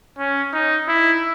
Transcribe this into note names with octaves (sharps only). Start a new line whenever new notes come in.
C#4
D#4
E4